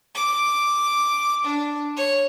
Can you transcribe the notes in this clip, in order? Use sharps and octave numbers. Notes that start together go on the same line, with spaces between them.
D6
D4
C#5